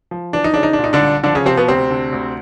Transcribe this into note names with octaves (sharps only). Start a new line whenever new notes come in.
F3
E3 D4
D#4
C#3 D4
D#4
D4
A#2
D#4
D3 D4
C2
D3 F3 D4
C#3 C#4
C3 F3 C4
B2 B3
D2 C3 C4
D3
D2